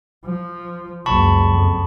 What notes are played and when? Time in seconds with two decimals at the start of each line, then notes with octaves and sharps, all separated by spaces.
0.25 F3
1.06 F#1 C#2 A5 B5 C#6
1.50 F2